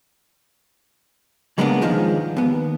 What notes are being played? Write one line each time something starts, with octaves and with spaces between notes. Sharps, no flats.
C#3 G3 G#3 A#3 B3 D4
G#2 D#3 F3 G#3
D#2 B3